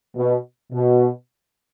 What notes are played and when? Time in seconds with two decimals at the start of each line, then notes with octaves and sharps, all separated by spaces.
0.17 B2
0.73 B2